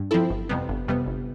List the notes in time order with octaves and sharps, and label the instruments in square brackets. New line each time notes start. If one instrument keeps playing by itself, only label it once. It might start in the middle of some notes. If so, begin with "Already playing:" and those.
Already playing: [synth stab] G2
F3 C4 E4 A4
G1
F2 C3 G3 B3
G1
F2 C3 G3 B3
G1